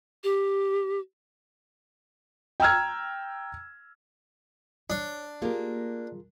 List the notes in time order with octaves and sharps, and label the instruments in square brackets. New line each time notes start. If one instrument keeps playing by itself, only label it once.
[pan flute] G4
[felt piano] G5 A#5 E6 F6 G#6
[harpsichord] D4 [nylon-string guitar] C#5
[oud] A#3 G4 [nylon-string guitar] F4 G#4 A#4